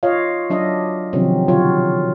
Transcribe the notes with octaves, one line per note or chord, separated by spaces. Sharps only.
F4 C#5 D#5 F5
F#3 D4 D#5 E5
C3 D#3 F3 F#3 C4 C#4
B2 D3 F#3 F4 F#4 C#5